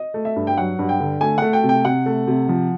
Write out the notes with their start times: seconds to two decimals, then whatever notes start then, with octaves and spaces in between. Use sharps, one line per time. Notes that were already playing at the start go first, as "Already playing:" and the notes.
Already playing: D#5
0.14 A3
0.25 E5
0.36 G2
0.47 G5
0.57 F#3 F#5
0.79 G2
0.89 G5
1.00 D3
1.21 A3 G#5
1.38 A3 F#5
1.53 G5
1.63 C3
1.69 G5
1.85 C3 F#5
2.06 A3
2.28 C3
2.49 F3